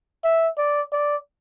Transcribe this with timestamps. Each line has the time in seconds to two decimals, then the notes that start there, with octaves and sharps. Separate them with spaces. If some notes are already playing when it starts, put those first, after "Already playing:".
0.24 E5
0.58 D5
0.93 D5